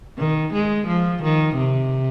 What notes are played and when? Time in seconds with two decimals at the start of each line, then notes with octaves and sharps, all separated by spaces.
0.18 D#3
0.53 G#3
0.87 F3
1.22 D#3
1.57 C3